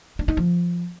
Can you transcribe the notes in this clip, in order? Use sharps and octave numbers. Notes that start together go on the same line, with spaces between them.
D4
D#4
F3